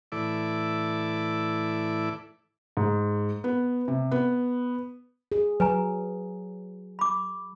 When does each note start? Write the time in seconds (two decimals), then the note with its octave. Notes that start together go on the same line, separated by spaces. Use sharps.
0.12 A2 E3 E4 A4 D5 D6
2.77 G#2
3.44 B3
3.88 C3
4.11 B3
5.32 G#4
5.60 F#3 B4 G#5 A#5
6.99 B5 D6